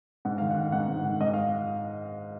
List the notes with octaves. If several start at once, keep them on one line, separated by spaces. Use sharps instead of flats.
G#2 F#5
D#3 F5
F#5
D#3
G#2 F#5
G#2
D#3
G#2 D#5
F5